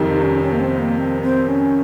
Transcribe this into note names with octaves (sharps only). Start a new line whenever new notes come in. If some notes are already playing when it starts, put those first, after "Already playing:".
Already playing: F2 C3 D#3 G3 D#4
C#4
C#4
A#3
C4
A#3
C4
C4
C#4